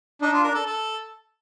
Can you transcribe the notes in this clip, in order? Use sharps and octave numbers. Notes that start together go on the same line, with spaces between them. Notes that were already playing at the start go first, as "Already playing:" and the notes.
D4 D#4
F4
A#4
A4
A4